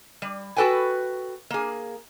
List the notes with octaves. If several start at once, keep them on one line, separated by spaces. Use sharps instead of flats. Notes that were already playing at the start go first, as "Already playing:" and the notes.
G3
F#4 A4 B4 G5 G#5
A#3 G#4